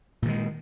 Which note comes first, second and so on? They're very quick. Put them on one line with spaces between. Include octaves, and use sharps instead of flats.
A#2 D#3 G#3